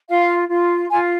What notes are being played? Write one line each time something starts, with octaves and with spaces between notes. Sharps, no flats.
F4 F5
F4
F4 G#5